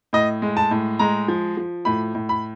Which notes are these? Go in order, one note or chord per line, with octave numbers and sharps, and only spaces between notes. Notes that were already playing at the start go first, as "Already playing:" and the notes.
A2 D#5
G#3
A5
A2
G#3 A#5
F3
F3
A2 B5
A2
B5